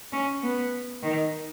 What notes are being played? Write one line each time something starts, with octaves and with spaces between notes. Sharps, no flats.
C#4
B3
D#3